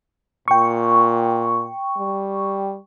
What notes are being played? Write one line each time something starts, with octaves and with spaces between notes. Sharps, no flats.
A#2 G5 C#6
G3